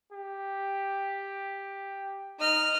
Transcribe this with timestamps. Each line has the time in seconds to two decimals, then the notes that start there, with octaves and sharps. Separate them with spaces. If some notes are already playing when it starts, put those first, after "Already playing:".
0.13 G4
2.40 D#4 D#5 F6